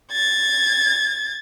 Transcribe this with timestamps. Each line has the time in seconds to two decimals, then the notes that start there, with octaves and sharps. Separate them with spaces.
0.12 G#6 A6